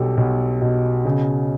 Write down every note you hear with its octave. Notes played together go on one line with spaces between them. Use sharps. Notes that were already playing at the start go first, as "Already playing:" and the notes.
Already playing: B1 G3 G4 A4
B1
B2
C#3